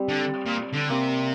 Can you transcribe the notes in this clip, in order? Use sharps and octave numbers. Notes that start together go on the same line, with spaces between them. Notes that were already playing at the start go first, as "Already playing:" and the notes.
Already playing: G3 C4
D3
A#2
D3
C3 A#3